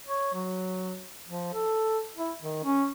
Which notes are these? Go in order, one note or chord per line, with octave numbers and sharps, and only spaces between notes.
C#5
F#3
F3
A4
E4
D#3
C#4